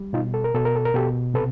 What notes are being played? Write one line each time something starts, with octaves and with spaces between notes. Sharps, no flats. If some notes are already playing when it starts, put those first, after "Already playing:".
Already playing: G3
B2 D#4 F4
A4
A#4
B2 A4
A#4
A4
A#4
B2 G4 A4
C3 A4 B4